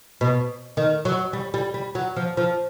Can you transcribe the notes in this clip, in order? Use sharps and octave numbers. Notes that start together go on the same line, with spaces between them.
B2
D#3
F#3
G3
G3
G3
F#3
F3
F3